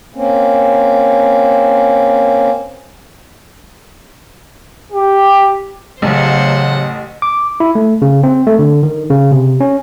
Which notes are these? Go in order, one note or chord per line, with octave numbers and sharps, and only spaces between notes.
A#3 C4 C#4
G4
A1 C#3 F#3 C5 F#5
D6
E4
A3
C#3
C4
A3
D3
D#3
C#3
C3
C#4